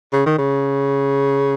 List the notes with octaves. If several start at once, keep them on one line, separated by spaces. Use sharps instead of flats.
C#3
D#3
C#3